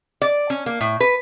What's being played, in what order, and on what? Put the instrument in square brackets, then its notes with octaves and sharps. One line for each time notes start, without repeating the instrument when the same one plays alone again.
[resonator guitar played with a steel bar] D5
C#4
A#3
A2
B4